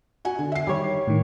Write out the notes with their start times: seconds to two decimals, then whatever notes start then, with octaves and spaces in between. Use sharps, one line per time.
0.25 F#4 F#5 G#5
0.39 D3
0.52 E5 C7
0.67 D#3 G3 C#5
1.07 A2 D#3